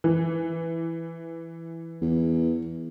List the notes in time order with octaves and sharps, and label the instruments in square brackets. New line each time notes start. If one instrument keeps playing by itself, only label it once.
[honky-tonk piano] E3
[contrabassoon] E2